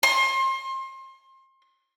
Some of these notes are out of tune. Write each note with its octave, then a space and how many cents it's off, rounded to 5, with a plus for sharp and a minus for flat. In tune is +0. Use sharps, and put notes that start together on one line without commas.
C6 +30